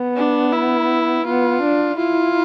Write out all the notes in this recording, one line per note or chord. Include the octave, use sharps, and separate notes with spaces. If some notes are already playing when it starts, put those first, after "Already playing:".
Already playing: B3
D4
E4
B3 F4
D4
E4 F4